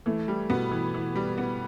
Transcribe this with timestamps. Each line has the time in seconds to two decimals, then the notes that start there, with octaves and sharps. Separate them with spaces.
0.06 E3 A3
0.28 G3
0.50 B2 B3
0.71 E3
0.94 E3
1.15 G3
1.38 B3